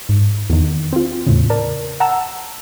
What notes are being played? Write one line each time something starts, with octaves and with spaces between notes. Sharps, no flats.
G#2
E2 D#3
C4 F4
E2 A2 C#3
A#4 D5 A5
F#5 A5 A#5 E6